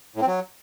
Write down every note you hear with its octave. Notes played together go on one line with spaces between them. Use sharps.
A2
C4
F#3